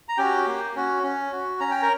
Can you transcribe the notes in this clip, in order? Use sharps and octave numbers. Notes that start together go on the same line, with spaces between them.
A#5
C#4 F#4 G4 G5
A#3
C#4 F#4
C#4
F#4
C#4 A#5
G5
A#4 A#5